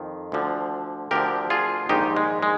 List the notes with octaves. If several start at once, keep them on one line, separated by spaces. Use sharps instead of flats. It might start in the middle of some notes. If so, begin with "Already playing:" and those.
Already playing: F2 D#3
D2 D3 F3
D2 D3 F3 G4 A#4
F4 G#4
A#1 G#2 D#3 D#4 G4
G#3
G#3